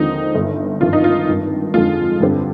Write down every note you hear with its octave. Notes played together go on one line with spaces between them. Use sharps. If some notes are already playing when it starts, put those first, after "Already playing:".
Already playing: D#2 D3 F3 G#3 C4 D#4
G1 G2 D#3
G#1 G2 F3 F4
D#4
F4
G#1 G2 D#3
F2 D3 G#3 F4
G2 D3 G3 C4